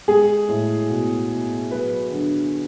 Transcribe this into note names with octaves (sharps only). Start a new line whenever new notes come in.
G#3 G#4
A2
B2
B2
F#3 B4
D3